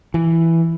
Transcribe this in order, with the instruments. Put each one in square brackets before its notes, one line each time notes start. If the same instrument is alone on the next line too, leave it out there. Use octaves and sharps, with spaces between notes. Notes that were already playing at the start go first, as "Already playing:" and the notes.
[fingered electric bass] E3